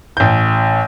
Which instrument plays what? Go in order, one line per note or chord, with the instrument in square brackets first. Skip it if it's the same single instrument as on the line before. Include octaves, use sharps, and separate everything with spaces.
[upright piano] A1 G6